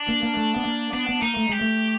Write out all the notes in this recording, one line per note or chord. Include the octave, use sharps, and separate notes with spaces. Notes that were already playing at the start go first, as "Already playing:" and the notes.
Already playing: D4
A#3
A#3
A3
B3
A#3
B3 D4
B3
A#3 D#4
A3
G#3 G4
A3